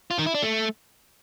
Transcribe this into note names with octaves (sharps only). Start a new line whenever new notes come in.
F4
D#3
E4
D4
A3